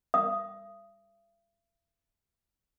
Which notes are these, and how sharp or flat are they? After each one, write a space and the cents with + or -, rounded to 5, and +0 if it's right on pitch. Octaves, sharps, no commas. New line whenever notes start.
E5 +45 D#6 +0